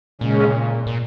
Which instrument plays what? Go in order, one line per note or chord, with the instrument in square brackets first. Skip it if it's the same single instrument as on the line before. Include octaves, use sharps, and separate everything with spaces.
[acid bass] A#2 [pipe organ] C#3 G#3 C#4
[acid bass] A#2